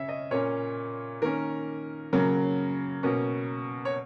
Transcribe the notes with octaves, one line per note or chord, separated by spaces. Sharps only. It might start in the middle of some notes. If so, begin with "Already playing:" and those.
Already playing: C#3 C#4 C#5 E5
D#5
A#2 A#3 C#4 C#5
D#3 A#3 C#4 A#4
C#3 F#3 A#3
B2 A#3 C#4
C#5